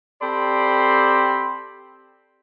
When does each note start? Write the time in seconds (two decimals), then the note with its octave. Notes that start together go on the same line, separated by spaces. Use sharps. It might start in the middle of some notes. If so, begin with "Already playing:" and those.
0.22 C4 G4 A4 D5 B5 C6